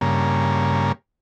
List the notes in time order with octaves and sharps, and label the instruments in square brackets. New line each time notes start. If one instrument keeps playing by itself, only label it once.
[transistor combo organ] G2 C#3 A#3